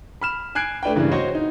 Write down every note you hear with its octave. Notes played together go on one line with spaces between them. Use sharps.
B5 F6 E7
G#5 F#6 G#6 C7 D7
A3 D4 B4 G5
G2 C#3 E3 A#3
F#4 C5 C#5 D#5 F#5
D#4